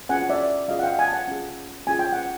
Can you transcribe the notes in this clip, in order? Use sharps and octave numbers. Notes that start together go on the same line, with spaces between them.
C#4 F4 G#4 F#5 G#5
D5 E5
C#4 F4 G#4 D#5 F5
F#5
F5 G5
F#5 G#5
A5
F#5 G#5
C#4 F4 G#4
C#4 F4 G#4 G#5
G5
F#5